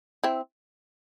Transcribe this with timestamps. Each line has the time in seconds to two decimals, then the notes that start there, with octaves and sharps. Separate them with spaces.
0.24 C4 E4